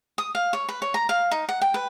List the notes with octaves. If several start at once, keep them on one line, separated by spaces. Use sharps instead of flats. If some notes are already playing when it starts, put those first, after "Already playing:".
D#6
F5
C#5
B4
C#5
A#5
F5
D#4
F#5
G5
B4